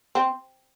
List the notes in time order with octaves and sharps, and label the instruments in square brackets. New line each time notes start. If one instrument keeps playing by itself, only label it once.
[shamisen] C4